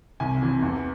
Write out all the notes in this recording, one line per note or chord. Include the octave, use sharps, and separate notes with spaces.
C2 G#5
C3 E3
E2